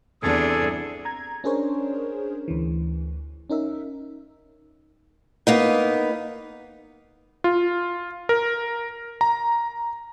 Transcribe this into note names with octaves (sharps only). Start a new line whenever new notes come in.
E2 C3 D4 G#4 A4
A#5 G#6
C#4 D4 G#4 A#4 C5 C#5
D2 E3
C#4 D#4 A#4 E5
A#3 B3 D#4
F4
A#4
A#5